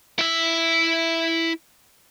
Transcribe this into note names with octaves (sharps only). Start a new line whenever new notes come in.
E4 E5